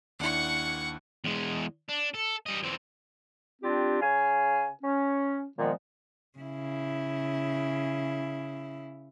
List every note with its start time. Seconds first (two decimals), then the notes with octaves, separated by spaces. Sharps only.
0.20 D#2 D4 E4 F#5 C#6
1.24 E2 G#3
1.89 D4
2.14 A4
2.46 G3 D#5
2.63 E2 C4
3.62 G3 C4 D4 F4 G4
4.01 C#3 F5 G#5
4.82 C#4
5.58 A#2 D#3 F3 G#3 B3
6.38 C#3 E4